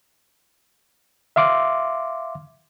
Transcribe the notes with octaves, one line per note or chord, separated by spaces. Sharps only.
E5 F5 C6 D6